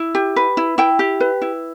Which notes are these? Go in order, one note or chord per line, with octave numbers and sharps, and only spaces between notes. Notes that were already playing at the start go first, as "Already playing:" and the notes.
Already playing: E4
G4
B4
E4
E4 G5
G4
B4
E4